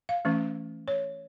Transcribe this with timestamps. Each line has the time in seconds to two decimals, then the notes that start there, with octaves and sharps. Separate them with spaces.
0.09 F5
0.25 E3 A3 C#4
0.88 C#5